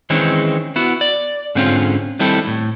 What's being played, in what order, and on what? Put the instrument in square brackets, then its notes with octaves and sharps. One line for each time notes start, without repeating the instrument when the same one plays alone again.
[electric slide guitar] D#3 E3 G#3 C4 C#4
B3 E4 F#4
D5
G#2 D3 C4 C#4 F4
D#3 G3 C4 E4 A4
A2